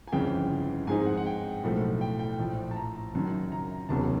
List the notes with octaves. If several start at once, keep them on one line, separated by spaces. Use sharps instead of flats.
G#5
G1 F2 C#3 E3 G5
G#2 F3 G#3 C4 D#4 G#5
F#5
F#5
G5
B1 A2 F3 A3
G5
G5
A#1 A2 F3
A5
A#5
F#1 F#2 D#3
A#5
F1 D#2 C#3 F#3 B3 A5